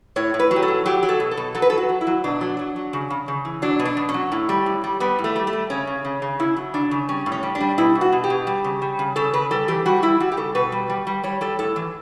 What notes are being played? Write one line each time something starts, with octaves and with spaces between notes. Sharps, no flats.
A2 C#5
A2
B4
F#3
G4
A4
A2
F#3 G4
F#3
A4
B2
A4
B2
F#3 A4
B4
F#3 A4
F#4
F#3
E4
F#3
B2 D4
F#3
F#3
F#3
C#3
C#3
C#3
E3
F#3 D4
B2
D4
B2
C#4
F#3
A2
G3
A2
G3
G3 B3
A2
A3
G3
A3
G3
C#3 C#4
C#3
C#3
C#3
C#3 E4
F#3
C#3 D4
C#3
G3 C#4
A2
C#4
G3
D4
G3
B2 E4
B2
F#4
B2
G4
B2
G3
C#3
G3
C#3
C#3 A4
C#3 B4
G3 A4
E3 G4
G3 F#4
G3 E4
G3 F#4
G4
C#3 A4
B2 B4
G3
G3
G3
G3 C#5
G3 A4
A2 A4
E3